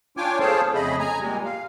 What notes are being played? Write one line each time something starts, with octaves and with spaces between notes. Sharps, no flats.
D4 F4 C#5 G5 G#5 D6
G#4 A4 C5 C#5 F5 A5
F2 C#3 A3 G#4 D#5 B5
G#5 A#5
A#2 G3 G#3
F5